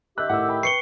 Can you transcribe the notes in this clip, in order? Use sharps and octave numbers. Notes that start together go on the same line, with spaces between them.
D#3 G4 E5 F#6
A2 F#5 E6
G5 B5
B4 C#6 C7 C#7 G7